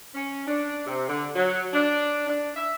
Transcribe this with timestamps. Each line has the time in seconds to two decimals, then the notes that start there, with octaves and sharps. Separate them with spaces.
0.15 C#4
0.47 D4
0.86 C3
1.08 D3
1.34 F#3
1.73 D4
2.27 D4
2.56 E5